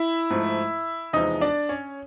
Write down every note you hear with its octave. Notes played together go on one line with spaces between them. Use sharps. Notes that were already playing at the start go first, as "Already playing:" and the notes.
Already playing: E4 E5
G#2 F3 A3
E2 C3 F3 G#3 D#4 D#5
D4 D5
C#4 C#5